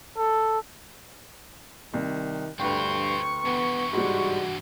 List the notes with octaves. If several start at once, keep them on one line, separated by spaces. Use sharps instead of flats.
A4
C2 D#3
D2 G2 C4 F4 B4 G5 C#6
G2 E3 B3
G#2 G3 F#4